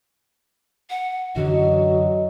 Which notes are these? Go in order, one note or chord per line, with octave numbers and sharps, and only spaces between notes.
F#5
F#2 D3 E3 F#3 F#4 D#5